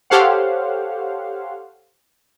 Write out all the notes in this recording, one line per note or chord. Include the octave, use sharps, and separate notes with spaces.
G4 A4 C5 C#5 F5 F#5